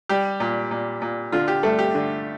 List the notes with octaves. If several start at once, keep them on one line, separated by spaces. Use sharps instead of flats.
G3 G4
A#2
A#2
A#2
D3 F4
G4
G2 A3 A4
G4
D3